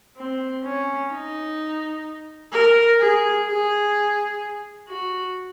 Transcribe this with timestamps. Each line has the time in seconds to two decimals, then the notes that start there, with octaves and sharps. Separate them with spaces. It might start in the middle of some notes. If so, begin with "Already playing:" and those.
0.17 C4
0.64 C#4
1.11 D#4
2.52 A#4
2.99 G#4
3.46 G#4
4.88 F#4